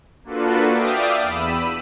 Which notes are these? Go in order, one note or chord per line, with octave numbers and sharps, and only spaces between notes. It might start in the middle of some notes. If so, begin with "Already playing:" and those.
A#3 D4 F4 F#4 A4 B4
D5 E5 F5 G5 D6 D#6
E2 B5 E6 D#7